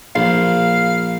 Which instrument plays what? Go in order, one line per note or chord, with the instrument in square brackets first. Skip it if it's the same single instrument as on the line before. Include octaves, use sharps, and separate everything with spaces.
[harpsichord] A#1 [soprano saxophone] F5